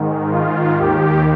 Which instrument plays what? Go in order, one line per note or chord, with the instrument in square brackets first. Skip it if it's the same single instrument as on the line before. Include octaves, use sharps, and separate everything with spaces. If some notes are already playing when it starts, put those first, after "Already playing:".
Already playing: [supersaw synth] G#2 D#3
F4
D#2 D#3 G4